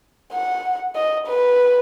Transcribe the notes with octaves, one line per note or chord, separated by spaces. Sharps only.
F#5
D#5
B4